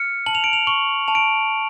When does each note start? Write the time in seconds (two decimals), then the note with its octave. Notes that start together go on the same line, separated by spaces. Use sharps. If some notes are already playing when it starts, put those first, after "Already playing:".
Already playing: F6 C#7
0.26 A5 F#7
0.35 F7
0.44 D7
0.53 F7
0.67 C#6 F#7
1.08 A5 F7
1.15 D7